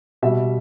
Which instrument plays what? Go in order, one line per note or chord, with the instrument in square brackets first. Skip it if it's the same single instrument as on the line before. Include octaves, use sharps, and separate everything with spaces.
[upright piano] B2 G3 E5